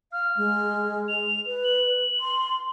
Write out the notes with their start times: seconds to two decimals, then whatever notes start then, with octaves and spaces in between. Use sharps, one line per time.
0.12 F5 F6
0.37 G#3
1.08 F7
1.46 B4
1.64 F#7
2.21 C6